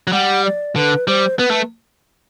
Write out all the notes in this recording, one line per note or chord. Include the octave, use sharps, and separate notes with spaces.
F#3
G3 F#5
D5
D3 B4
G3 C5
B3 B4
A3